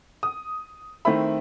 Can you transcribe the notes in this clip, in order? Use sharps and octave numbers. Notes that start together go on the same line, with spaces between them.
D#6
D#3 A3 C4 E4 B5